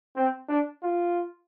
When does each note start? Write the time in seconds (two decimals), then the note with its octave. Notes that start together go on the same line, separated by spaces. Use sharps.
0.16 C4
0.49 D4
0.82 F4